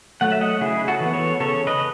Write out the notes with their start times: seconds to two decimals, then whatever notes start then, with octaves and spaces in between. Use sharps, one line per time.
0.21 F#3 A3 F#5
0.32 E5
0.41 D#5 F#5
0.61 C#3 E4 G#4
0.88 F#4 A4
1.00 E3 B3
1.14 A4 C#5
1.40 C#3 A4 C#5
1.67 B4 D#5